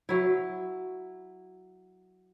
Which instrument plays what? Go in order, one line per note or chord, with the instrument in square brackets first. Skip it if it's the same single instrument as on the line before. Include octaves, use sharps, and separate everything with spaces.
[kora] F#3 E4